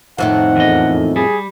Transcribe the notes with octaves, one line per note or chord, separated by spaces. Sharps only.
F2 A2 D#3 D#4 F#5
E2 D#5
G3 G#4